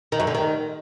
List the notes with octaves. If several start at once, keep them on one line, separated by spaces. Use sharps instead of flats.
D#3
F#2
D3
D#3